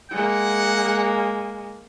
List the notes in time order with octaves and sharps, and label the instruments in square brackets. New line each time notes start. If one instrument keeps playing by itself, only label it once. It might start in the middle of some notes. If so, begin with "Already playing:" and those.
[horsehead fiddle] G#3 A#3 [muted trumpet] F#5